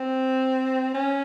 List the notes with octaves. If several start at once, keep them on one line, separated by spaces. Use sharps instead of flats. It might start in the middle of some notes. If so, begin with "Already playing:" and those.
Already playing: C4
C#4